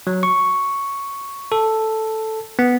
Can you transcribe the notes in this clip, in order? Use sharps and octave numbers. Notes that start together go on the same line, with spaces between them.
F#3
C#6
A4
B3